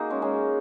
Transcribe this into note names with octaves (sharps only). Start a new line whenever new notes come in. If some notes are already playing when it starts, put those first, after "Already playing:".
Already playing: A#3 D#4 F#4 G#4
G#3 C#4
G#3 C#4